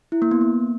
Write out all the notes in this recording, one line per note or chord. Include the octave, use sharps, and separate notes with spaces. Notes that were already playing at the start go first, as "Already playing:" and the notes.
E4
A#3
B3
A#3